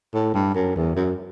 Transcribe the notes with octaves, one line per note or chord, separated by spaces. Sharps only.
A2
G2
F#2
E2
F#2